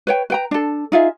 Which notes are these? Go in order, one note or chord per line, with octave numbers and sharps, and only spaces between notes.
B4 C#5 G5
B4 G5 A#5
D4 A4
D#4 F4 G#4 E5